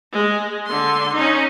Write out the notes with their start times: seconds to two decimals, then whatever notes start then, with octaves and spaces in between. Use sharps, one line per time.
0.13 G#3
0.66 D3 C6
1.14 C#4 D#4